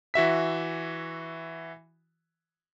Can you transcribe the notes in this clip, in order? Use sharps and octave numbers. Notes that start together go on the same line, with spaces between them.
E3 F#4 E5 B6